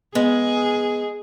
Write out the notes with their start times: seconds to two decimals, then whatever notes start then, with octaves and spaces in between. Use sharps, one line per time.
0.15 G#3 B3 G#4